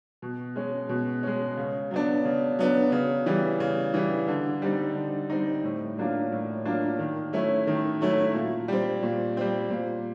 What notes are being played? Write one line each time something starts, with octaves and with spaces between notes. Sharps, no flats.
B2
G#3 C#4
B2
G#3 C#4
C#3
F#3 B3 D4
C#3
F#3 B3 D4
C#3
E3 G3
C#3
E3 G3
D3
G3 C4 D#4
D3
G3 C4 D#4
A2
F#3 A#3 D4 F4
A2
F#3 A#3 D4 F4
D#3
F#3 A3 C#4 E4
D#3
F#3 A3 C#4 E4
A#2
G3 C4
A#2
G3 C4
A#2